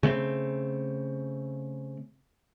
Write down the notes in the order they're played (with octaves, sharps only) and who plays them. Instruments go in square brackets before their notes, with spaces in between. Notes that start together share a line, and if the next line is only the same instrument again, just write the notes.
[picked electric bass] C#3 A3 B3 C4